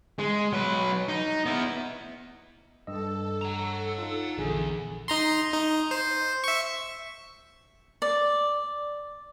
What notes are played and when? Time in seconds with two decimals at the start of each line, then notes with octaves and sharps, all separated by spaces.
0.19 G#3
0.53 F#3 B4
1.08 D#4
1.46 B3 E4
2.87 G2 A4 D#5 E6
3.42 F#5 A#5
3.98 D#4 F4
4.38 A#1 E2 D3 G#4
5.08 D#4 A#5 C6
5.53 D#4
5.91 C5
6.44 E5 C#6
8.02 D5